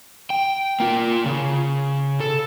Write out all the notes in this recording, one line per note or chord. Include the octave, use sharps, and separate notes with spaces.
G5
A#3 F4
C#3
A4